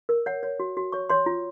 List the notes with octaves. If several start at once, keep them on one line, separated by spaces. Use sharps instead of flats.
A#4
C#5 F#5
C#5
F#4
F#4
C#5 C#6
C#5 C6
F4